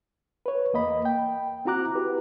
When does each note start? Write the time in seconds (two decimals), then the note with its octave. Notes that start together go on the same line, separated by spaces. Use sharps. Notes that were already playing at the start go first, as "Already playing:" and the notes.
0.46 B4 C#5
0.73 E2 A#3 D#5 B5
1.05 G5
1.65 C4 E4 F#4 A#5 D6 F#6
1.95 E4 G4 B4